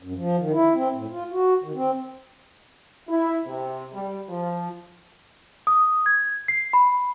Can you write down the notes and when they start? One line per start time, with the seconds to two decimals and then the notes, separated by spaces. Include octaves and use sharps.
0.03 F#2
0.16 F3
0.39 D#3
0.53 E4
0.75 C4
0.94 A2
1.11 F4
1.32 F#4
1.64 D#3
1.75 C4
3.09 E4
3.45 C3
3.92 G3
4.29 F3
5.67 D#6
6.06 G#6
6.48 C7
6.73 B5